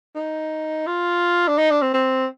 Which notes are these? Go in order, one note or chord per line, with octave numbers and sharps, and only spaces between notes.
D#4
F4
D4
D#4
D4
C4
C4